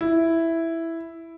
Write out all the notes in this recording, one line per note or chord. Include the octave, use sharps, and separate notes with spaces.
E4